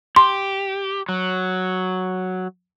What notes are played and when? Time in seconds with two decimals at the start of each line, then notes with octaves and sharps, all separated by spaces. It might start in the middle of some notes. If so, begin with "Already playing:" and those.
0.16 G4 C6
1.09 F#3